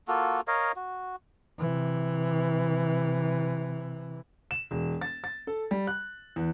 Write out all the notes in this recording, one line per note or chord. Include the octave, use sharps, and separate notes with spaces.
A#3 F4 F#4 A4
A#4 C#5 D#5 F5
F#4
C3 E3
E7
E1
A6
A6
A4
G3
F#6
E2